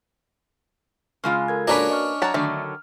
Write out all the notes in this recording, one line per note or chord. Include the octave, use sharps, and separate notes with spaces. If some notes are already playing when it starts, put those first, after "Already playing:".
C#3 G#3 F4 B5 F6
A4 A#4 G#6
A#3 C#4 D4 F#4 A#4 B4 D5
D#5 C#6 F6
F#3 C#5 F#5 A5 A#5
D3 D#3 F#3 A3 D5 F6